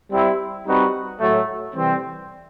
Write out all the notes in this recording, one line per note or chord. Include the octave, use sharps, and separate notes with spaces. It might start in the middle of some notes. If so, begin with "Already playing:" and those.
G3 C4 E4
G3 C4 D#4 F#4 B4
A2 F#3 A3
C3 E3 G3 C4